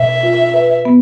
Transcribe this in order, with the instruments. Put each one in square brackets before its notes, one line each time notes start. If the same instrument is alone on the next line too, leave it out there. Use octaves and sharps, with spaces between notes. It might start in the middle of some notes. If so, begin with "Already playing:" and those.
Already playing: [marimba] B2 [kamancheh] E5
[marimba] F4
B4
B3